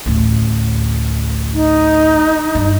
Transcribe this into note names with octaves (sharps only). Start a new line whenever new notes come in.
A1 D2
D#4
G2